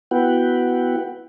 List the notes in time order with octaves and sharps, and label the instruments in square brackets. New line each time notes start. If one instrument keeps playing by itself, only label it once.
[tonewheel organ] B3 E4 F#4 B4 F#5 G5